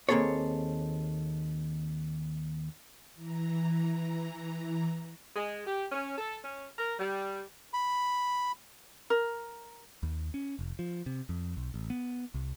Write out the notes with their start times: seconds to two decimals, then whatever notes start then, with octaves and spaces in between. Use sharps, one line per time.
0.09 D#2 A#3 C4 G#4 A4 C#5
3.15 E3 A#5
5.36 G#3
5.67 G4
5.92 C#4
6.18 A4
6.44 C#4
6.79 A#4
6.99 G3
7.73 B5
9.10 A#4
10.03 D#2
10.34 C#4
10.59 F1
10.79 F3
11.06 C3
11.29 F2
11.57 B1
11.74 A1
11.90 B3
12.34 C2